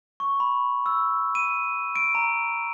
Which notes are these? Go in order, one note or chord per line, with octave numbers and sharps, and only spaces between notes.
C#6
B5
E6
D#7
D7
A#5